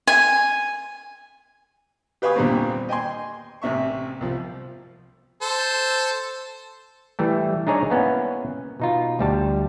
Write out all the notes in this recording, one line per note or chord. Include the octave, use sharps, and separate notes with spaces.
G#5
G4 B4 F5 G#5 C#6 D#6
E2 A#2 D3 G3 A#3 C4
D#5 G5 G#5 C6
A1 C3 E5 C#6
C2 F3
A4 C5
E3 G3 A3
D4 D#4 G#4 C#5 D5
A#3 B3 C#4 E4
B2 D#4 F4
D2 G3 A5